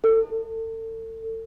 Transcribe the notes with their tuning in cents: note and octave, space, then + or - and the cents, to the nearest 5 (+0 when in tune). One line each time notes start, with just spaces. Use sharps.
A4 +35